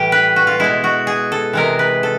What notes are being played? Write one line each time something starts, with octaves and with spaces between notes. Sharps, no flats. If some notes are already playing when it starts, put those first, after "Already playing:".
Already playing: A2 E3 G3 G4
B4
F#4
F4
B2 G#3 E4
F#4
G#4
A4
C3 E3 G#3 A#4
B4
A4